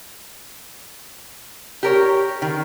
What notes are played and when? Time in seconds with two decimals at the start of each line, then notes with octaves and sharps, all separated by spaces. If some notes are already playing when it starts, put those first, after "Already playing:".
1.83 G4 A#4 C#5
2.42 D#3